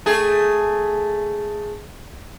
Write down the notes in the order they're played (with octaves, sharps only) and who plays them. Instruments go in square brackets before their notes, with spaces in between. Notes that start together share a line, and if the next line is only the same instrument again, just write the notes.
[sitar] A3 G#4